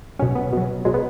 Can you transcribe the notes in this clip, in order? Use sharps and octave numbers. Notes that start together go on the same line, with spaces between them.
B2 F#3 C#4
B3
B2 F#3
B2 F#3 G#3
B3